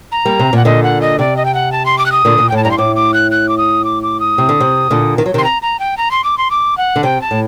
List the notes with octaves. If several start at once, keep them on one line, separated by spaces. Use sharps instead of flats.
A#5
G3 A#3
C3
A#2 F#5
A#2 D3 D#5
F#5
D#5
C3 D5
D#5
G5
F#5
A5
C6
D6
F#6
D#6
A#2 D3
A#2
G5
A2 A5
G2 A#5
C6
A2 D6
D6
F#6
F#6
D6
D#6
D6
D6
D#6
C3
D3
C3
A#2 D3
D#3
F#3
C3 D#3 C6
A#5
A#5
G5
A#5
C6
D6
C6
D6
F#5
D3
C3 G5
A5
A2